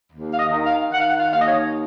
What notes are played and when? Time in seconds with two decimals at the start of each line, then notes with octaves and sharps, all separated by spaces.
0.10 D#2
0.31 F5
0.37 D#5
0.50 D#3
0.64 F5
0.92 D#3 F#5
1.00 F5
1.09 F#5
1.18 F5
1.31 D#2 F5
1.38 D#5
1.46 C#5